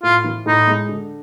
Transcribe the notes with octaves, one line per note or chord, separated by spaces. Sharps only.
A2 F4
E3
A2 D#4
G#3
D3